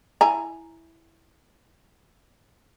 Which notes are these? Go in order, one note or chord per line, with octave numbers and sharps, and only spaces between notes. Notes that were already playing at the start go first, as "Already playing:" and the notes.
E4 G#5 A#5